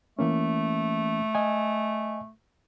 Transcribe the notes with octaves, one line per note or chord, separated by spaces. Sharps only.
E3 A3 A#3 C#4
D#5 G#5